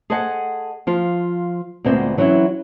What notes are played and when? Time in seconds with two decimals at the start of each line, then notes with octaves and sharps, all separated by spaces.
0.10 G#4 A4 C5 D#5 F#5 G#5
0.87 F3 F4
1.84 D2 A#2 G#3 B3 C4
2.17 E3 F#3 C4 C#4 E4